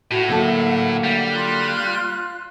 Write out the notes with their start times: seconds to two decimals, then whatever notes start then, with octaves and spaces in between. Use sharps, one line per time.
0.11 A2 F#4 E5 F#5
0.28 D3 F#3 A#3 A4
1.04 G3
1.32 F4 F#6